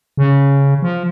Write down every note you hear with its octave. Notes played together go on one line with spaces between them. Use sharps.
C#3
F3